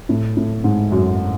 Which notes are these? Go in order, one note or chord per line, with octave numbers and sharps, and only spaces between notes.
A2
A2
G#2
F#2